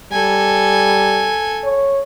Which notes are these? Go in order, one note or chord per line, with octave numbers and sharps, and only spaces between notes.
G3 A4 G#5
C#5